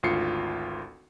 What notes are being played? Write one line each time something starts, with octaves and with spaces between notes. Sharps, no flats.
G#1 D2 F4 C7 C#7